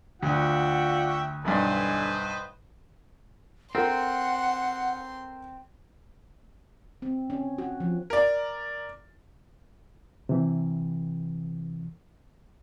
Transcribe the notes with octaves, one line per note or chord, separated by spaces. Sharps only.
D2 F4 F#4 D5 E5 F#5 G5
B1 G2 D3 E3 B4 C5 D#5 G#5
C4 A4 A#4 F#5 C6
C4
C#4
F#4
F3
A#4 D5
C3 E3